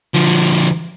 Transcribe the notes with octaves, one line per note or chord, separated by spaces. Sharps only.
D3 F3